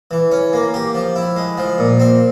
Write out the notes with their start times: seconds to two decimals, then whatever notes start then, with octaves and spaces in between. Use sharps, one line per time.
0.11 E3
0.32 C#4
0.53 A#3
0.74 G4
0.94 F3
1.16 E4
1.36 G#3
1.58 F3
1.78 A#2
2.00 C4